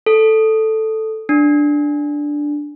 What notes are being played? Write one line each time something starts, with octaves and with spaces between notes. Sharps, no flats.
A4
D4